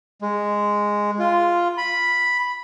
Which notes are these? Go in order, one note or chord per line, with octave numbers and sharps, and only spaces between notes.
G#3
F4
B5